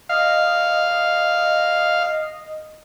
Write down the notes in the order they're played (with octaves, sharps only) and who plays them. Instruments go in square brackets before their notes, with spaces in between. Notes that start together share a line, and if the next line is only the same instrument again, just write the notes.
[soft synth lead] D#5 [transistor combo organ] F5